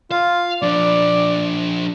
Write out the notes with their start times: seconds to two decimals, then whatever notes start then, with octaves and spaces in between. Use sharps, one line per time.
0.11 F4 F5
0.62 F3 D4 D5